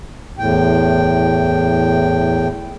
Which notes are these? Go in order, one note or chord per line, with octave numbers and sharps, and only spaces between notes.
E2 A2 G5